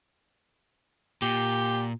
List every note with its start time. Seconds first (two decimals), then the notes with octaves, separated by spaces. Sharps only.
1.22 A#2 G4